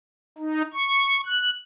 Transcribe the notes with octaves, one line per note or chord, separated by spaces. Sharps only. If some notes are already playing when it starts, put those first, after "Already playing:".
D#4
C#6
F#6